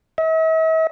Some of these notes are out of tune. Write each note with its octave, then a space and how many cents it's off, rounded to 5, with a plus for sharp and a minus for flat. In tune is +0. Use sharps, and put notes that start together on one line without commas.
E5 -45